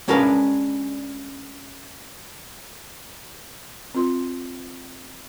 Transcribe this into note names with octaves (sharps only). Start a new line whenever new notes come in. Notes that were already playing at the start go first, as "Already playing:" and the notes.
G#3 C#4 D4 A#4 B4 F5
C4 F4 C6